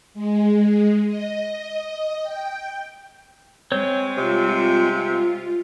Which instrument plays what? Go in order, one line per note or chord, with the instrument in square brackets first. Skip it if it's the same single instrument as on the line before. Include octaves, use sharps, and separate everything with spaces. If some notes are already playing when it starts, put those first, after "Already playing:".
[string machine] G#3
D#5
G5
[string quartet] G#3 [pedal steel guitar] C4 C#5 G6
[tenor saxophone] C3 [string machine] F4